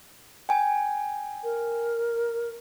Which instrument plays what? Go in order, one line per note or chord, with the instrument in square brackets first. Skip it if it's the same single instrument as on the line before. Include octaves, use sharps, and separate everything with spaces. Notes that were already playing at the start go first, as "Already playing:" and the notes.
[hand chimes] G5 G#5
[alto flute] A#4